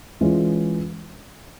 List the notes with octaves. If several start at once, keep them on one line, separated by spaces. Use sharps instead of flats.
E3 G#3 C#4 F4